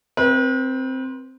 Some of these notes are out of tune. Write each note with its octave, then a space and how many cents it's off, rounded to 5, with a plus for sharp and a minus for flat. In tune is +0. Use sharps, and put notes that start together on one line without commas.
C4 +0 B4 -40